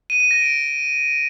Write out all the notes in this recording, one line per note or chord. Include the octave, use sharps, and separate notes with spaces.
D#7
D#7
A#6
D7